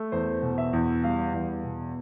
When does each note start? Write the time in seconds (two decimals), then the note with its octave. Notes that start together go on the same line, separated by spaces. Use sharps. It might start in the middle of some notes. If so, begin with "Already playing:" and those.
Already playing: A3
0.12 E2 C5
0.42 B2
0.58 E5
0.73 E2
1.04 G3 F5
1.34 E2
1.64 B2